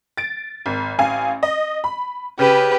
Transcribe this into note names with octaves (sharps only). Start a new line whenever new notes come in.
A6 D7
G#1
A1 F5 G#5
D#5
B5
C#3 G4 B4 D#7